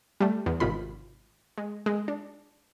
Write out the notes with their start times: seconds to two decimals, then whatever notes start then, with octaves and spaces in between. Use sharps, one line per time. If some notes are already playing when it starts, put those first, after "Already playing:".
0.20 G3 A3
0.46 E2
0.60 G#1 C3 F4 B5
1.58 G#3
1.86 G#3
2.08 D4